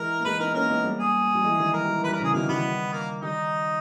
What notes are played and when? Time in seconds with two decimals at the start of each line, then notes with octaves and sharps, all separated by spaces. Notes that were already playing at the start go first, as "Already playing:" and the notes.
Already playing: E3 G#3 A#4
0.20 A#3
0.25 E3 G#3 B4
0.40 B3 D#4 A#4
0.51 B3
0.54 A#3 C#4 A#4
0.70 G#3 B3
0.84 G3 A#3
1.00 G#4
1.35 G3
1.44 E3 G#3
1.59 D#3 G3
1.74 E3 A#4
1.85 G3
1.98 E3
2.04 G3 B4
2.13 A#4
2.20 C#3 E3 G#4
2.33 B2 D#3 A#3
2.48 D#3 G3 B3
2.93 A#3
3.22 D#3 G3 D#4